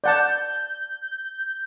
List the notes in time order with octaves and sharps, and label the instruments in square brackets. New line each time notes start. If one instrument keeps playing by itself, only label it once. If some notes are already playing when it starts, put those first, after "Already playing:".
[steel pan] D5 F#5 A5 [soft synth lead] G6